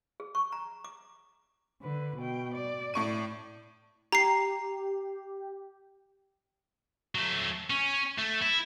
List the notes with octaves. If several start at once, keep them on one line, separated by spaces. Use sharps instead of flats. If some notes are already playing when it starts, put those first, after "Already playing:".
G#4
C#6
A#5
D6
D3 B4
B2 G5
D5
A2 C#6 D#7
G4 A#5 C7
F#3 A3
C#4
A3
E4